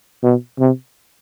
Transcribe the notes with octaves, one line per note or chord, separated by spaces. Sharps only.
B2
C3